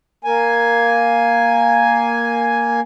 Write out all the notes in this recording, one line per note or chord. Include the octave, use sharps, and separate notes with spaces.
A#3 G#5